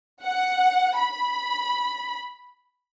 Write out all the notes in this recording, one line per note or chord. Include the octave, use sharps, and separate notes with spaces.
F#5
B5